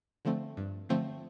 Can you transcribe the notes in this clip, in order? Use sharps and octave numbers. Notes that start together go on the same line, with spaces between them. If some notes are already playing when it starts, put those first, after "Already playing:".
D3 F3 A3 C4
G2
D3 F3 A3 C4